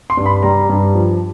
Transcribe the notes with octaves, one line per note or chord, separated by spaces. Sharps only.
C6
G2
B5
G3 A#5
G2
F3